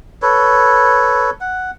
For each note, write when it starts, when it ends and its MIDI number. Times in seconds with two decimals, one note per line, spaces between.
0.22 1.30 69
0.22 1.30 71
0.22 1.30 73
1.41 1.71 78